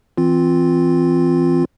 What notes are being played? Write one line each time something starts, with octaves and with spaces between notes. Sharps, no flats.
E3 C4 F4